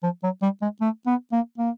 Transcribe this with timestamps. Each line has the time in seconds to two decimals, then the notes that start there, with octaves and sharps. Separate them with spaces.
0.03 F3
0.23 F#3
0.42 G3
0.62 G#3
0.81 A3
1.07 B3
1.32 A#3
1.58 A#3